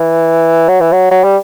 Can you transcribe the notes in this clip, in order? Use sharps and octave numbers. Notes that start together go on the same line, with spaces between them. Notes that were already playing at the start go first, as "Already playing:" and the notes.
Already playing: E3
F#3
E3
F#3
F#3
G3